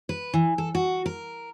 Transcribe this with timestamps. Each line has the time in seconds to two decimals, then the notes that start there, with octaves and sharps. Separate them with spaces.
0.09 B4
0.34 E3
0.58 A4
0.75 F#4
1.06 A#4